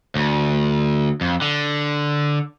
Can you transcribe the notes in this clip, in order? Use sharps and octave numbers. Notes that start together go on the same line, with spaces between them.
D2
F2
D3